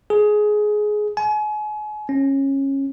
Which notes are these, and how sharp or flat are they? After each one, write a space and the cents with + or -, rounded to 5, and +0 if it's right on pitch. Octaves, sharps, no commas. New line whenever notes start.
G#4 +15
G#5 +35
C#4 -20